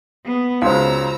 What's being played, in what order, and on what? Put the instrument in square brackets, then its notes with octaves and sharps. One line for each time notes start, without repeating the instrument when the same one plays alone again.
[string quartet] B3
[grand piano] C#2 C#3 [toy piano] D#4 F#4 C5 [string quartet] A#5 E6